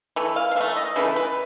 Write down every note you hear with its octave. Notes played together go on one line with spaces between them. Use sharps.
E3 A3
F5
F5
E3 A3 E5
D#5
C#3 E3 A3 B4
B4